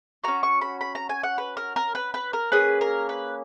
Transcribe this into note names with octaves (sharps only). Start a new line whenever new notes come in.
C#4 F#4 A#5
C#6
B5
B5
A#5
G#5
F#5
B4
A#4
A#4
B4
B4
A#4
A#3 C#4 G#4 B4
A#4
B4